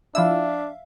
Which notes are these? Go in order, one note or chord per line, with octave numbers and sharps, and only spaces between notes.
F3 D4 E4 E5 F5 E6